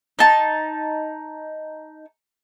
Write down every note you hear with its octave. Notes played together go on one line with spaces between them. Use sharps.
D#4 A5